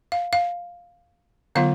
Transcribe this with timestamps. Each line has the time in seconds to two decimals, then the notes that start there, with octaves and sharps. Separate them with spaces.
0.12 F5
0.33 F5
1.55 D3 F#3 B3 F4 F5